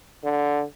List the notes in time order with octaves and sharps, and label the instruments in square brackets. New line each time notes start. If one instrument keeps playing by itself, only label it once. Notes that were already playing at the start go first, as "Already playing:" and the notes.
[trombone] D3